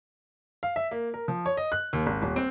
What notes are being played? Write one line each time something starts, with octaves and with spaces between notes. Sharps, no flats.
F5
E5
A#3
A#4
F3
C#5
D#5
F#6
D#2
G#1
D#1
C4